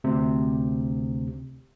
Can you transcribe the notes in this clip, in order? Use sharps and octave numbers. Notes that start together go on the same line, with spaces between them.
D2 C3